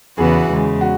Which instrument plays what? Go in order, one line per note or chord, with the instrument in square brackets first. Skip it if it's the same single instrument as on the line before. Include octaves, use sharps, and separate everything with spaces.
[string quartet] E2 C#3 E3 B3 F#4 [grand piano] G#4
[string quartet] E2 C#3 G#3
[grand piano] F#4